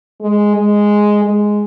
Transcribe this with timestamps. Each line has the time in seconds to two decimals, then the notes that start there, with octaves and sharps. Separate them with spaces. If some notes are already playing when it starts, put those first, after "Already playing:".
0.21 G#3
0.56 G#3
1.25 G#3